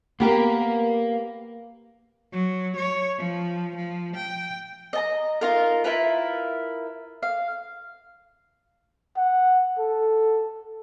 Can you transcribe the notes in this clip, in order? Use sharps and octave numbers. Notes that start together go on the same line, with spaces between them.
A#3 B3 G4 A#4
F#3
C#5
F3
F3
G5
D#5 A5 A#5
D#4 F4 A#4
E4 F4 A#4 B4
F5
F#5
A4